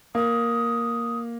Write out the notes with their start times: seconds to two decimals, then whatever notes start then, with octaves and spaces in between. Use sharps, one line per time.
0.15 A#3 D#6